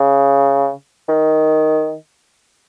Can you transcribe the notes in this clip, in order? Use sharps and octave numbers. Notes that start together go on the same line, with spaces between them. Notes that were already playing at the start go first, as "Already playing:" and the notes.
Already playing: C#3
D#3